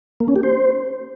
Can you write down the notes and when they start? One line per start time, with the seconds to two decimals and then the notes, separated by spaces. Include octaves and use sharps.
0.20 A#3
0.28 C#4
0.36 G4
0.43 C5